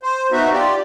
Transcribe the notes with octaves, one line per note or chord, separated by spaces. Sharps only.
C5
B3 D#4 F#4 E5
F4 G4 D5